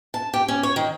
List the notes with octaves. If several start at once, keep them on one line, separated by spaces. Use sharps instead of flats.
A5
G4
C#4
C#5
D#3